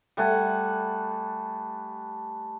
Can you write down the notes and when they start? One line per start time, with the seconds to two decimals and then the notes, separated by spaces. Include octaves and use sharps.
0.17 G3 A3 F#5 G#5